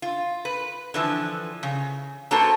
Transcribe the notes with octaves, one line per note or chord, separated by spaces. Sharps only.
F4
B4
D3 E3 F3
C#3
A#3 F#4 A4 B4 C5 A5